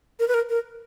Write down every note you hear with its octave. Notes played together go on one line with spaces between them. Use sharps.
A#4
B4
A#4
A#4